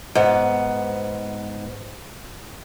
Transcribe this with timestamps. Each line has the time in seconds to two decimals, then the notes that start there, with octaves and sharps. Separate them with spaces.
0.15 G#2 B3